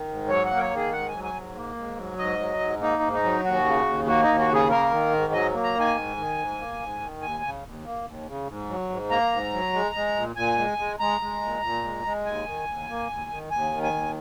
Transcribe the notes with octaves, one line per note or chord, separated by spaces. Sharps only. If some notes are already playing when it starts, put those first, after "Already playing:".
Already playing: D#3
G#2
F#3 C#5
A#3 F#5
A#4
C#5
D#3
G#4
G#2 F#5
F#3 G#5
G#5
G#2
A#3
G#2
F#3
G#2 D#5
F#3
G#2
A#3 D#4
G#2
D#4
F#3
D#2 F#4
C#3
D#2
A#3 F#4
D#4
D#2
F#4
C#3
G#4
A#3 A#4
D#3
G#2
F#3 D#5
A#3
A#5
D#3
G#5
G#2
D#3
G#2
A#3
G#2
D#3
D#2 G#5
C#3
D#2
A#3
D#2
C#3
G#2
F#3
G#2
A#3 A#5
G#2
F#3
G#3
G#3
A#2
A#2 G#5
G#3
G#3
G#3 A#5
G#3
A#2
A#2
G#3
G#3
D#2 G#5
D#3
D#2
A#3
D#2
D#3
D#2 G#5
D#3
G#5
D#2